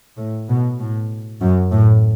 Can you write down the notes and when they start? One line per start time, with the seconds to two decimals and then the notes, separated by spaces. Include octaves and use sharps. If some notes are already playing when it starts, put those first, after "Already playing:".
0.17 A2
0.48 B2
0.80 A2
1.40 F#2
1.72 A2